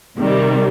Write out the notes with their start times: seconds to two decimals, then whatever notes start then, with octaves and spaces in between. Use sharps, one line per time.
0.17 C3 D#3 G3